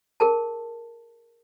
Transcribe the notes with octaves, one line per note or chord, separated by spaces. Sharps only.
G#4 A#4 A5